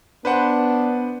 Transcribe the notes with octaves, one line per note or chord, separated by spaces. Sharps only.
B3 D4 B4 C5 F#5